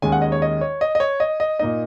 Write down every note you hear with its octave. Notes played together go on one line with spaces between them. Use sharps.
D#2 D#3 G#3 C#4 G#5
F#5
D#5
C#5
D#5
C#5
D#5
D#5
C#5
D#5
D#5
A#2 A#3 D#4 D#5